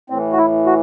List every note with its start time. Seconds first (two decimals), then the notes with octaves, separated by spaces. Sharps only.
0.10 A2 E3 C4
0.32 F#4
0.38 E4
0.66 F#4